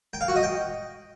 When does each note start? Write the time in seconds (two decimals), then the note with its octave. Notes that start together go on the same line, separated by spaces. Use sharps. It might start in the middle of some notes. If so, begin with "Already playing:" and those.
0.13 G5
0.21 F5
0.28 F#4
0.36 D#5
0.43 G5